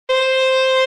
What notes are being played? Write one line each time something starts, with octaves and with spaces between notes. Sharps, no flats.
C5